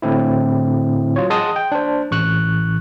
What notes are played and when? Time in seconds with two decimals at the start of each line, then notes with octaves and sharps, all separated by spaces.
0.02 A2 D3 C4 E4
1.16 F#3 F4 C#5
1.30 G#4 D#5 F#5 A5 C6 D#6
1.56 G5
1.72 D4 C5
2.11 A1 C#6 F#6